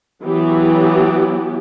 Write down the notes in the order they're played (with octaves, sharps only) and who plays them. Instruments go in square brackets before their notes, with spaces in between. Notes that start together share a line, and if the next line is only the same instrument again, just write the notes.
[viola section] E3 F#3 B3 G4